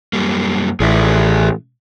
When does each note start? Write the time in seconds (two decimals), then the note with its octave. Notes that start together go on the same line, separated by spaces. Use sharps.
0.13 F#2 G3 A#3
0.80 A1 G#4 D5 E5